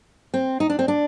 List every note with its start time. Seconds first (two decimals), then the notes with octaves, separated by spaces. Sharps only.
0.34 C4
0.60 D#4
0.70 D4
0.79 C4
0.88 D4